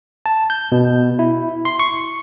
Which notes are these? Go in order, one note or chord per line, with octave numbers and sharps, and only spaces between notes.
A5
G6
B2
E4
C6
C#6